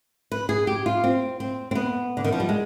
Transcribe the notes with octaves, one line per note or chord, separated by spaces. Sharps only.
B4
G#4
G4
F4
C4
C4
C4
B3
D3
D#3
F3
G3
G#3